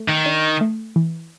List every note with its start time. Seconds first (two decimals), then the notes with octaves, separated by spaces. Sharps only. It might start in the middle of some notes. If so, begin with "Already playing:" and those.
Already playing: A3
0.08 D#3
0.26 D4
0.61 A3
0.96 E3